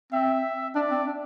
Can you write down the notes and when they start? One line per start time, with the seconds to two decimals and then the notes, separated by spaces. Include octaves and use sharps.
0.12 C4 E5
0.75 D4 D5
0.91 C4
1.07 D4